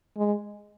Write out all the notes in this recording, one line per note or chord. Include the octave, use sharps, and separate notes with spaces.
G#3